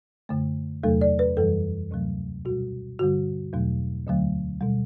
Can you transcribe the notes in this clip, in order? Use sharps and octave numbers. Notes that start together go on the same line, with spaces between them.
F#2 D3 A3
E2 C3 F#3 A3 A4
D5
B4
F#2 E3 G3 A4
D2 C3 F#3 A3
B2 G3 F#4
G2 D3 G3 F#4
E2 B2 F#3 A3
D2 D3 F#3 A3
B2 G3